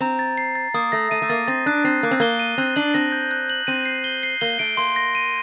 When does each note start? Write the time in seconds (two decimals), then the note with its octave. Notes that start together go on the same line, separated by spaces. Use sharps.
0.01 C4 A#5
0.19 A6
0.38 C7
0.55 A6
0.74 A#3 D#6
0.92 A3 A#6
1.11 A3 D#7
1.22 A3
1.29 A#3 A6
1.47 C4 A6
1.66 D4 F#6
1.84 C4 C7
2.03 A#3 F#6
2.11 C4
2.20 A#3 G7
2.39 D#7
2.58 C4 F#6
2.76 D4 F#7
2.94 C4 A#6
3.12 G6
3.31 F#6
3.50 F#7
3.67 C4 D#7
3.85 C7
4.04 G7
4.23 C7
4.41 A#3 G7
4.59 A3 D7
4.77 A#3 C6
4.96 A#6
5.15 D#7